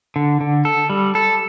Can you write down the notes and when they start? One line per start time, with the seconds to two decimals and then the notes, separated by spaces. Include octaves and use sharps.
0.16 D3
0.41 D3
0.65 A4
0.90 G3
1.15 A4